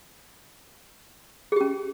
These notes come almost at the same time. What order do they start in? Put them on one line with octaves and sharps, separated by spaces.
G#4 G4 C#4